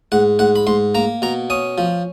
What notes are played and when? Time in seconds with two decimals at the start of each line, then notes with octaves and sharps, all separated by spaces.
0.12 G#2 F#5
0.39 G#2 F#5
0.56 B5
0.67 G#2 C6
0.95 A#3 A#5
1.22 B2 A#5
1.50 C#4 D#6
1.78 F3